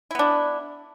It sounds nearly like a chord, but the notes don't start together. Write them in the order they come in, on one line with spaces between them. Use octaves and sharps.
E4 B3 D4